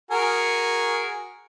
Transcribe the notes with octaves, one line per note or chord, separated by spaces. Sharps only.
F#4 G#4 A#4